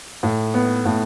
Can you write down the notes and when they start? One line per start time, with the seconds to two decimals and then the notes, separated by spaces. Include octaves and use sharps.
0.23 A2
0.54 B3
0.85 A2